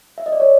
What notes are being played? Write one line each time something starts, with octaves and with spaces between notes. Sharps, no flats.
E5
D#5
D5
C#5